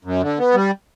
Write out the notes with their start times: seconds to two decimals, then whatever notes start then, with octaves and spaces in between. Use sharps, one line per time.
0.05 F#2
0.22 D3
0.39 B3
0.54 G3